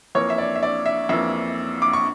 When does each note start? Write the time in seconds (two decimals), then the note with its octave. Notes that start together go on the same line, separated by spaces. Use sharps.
0.15 F2 E3 A#3 C#5
0.30 E5
0.38 D5
0.55 E5
0.63 D5
0.86 E5
1.09 F2 E3 A#3 E5
1.82 D6
1.93 C#6